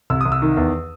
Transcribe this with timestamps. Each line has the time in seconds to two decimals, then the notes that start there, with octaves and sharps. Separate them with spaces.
0.10 C2 E6
0.21 C2 D#6
0.32 E6
0.42 D#3
0.57 E2